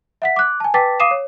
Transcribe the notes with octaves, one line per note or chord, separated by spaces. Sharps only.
E5 F#5 B6
D6 F#6
G#5 A5
B4 G5 A5 D6 A6 B6
F5 D6 D#6 C7 D#7 E7
C#5